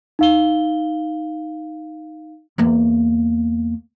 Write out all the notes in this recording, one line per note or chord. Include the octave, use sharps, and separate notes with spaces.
D#4 F5 G7
E2 A#3